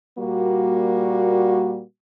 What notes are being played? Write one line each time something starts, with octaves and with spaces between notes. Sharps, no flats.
A#2 G3 A#3 F#4